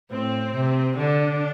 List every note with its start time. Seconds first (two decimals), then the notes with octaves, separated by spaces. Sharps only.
0.11 A2 C4
0.54 C3
0.97 D3 D4